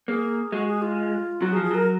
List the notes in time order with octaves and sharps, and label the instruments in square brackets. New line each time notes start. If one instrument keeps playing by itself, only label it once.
[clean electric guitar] A#3 [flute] G#4
[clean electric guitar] G#3 [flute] F#4
[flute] G#4
F4
[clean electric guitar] F#3 [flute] F#4
[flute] G#4
[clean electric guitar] F3
[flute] G#4
[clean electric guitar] F#3 [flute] A#4